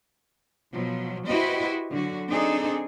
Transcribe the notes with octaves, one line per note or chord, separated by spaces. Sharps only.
B2 F3 F#3
E4 F#4 G4 B4 C5 D#5
D3 F#3 F#4
C4 D4 D#4 G#4 A4